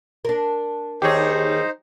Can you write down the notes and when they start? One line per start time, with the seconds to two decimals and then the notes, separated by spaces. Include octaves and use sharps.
0.25 D4 A#4
1.02 D#2 D#4 G4 G#4 C5 C#5